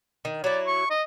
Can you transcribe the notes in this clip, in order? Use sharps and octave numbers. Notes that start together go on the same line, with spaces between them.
D#3
F#3 E4 D5
C#6
D#5